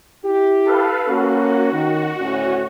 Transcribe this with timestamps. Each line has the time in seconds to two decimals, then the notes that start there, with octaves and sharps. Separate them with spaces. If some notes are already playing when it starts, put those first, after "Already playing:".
0.24 E4 G4
0.65 A4 B4 F5
1.08 A#3 C#4 F#4
1.72 D#3
2.20 D2 A2 C#4